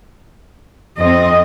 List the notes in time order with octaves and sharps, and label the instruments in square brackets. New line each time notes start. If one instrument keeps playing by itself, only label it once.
[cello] F2 C4 [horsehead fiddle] D#5